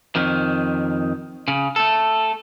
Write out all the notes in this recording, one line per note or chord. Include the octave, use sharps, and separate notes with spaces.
F2 D#3
C#3
A3 A4